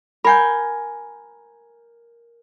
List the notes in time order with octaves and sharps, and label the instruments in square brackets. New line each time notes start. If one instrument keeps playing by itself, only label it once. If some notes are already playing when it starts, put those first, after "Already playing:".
[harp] A#4 G#5 G6 [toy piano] F#5 B5